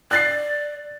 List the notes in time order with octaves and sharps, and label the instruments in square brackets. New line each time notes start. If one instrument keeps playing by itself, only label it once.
[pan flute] D5 [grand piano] F#6 A6 C7